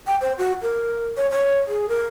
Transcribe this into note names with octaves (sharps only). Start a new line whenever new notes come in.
G5
C5
F#4
A#4
C#5
C#5
G#4
A#4